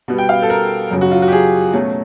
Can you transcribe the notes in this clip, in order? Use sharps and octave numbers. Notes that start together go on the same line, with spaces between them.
B2 G3 B3
G5
F5
A4
A#4
F#2 C#3 F#3
F#4
F4
F#4
G4
G#4
B2 F#3 A3 C#4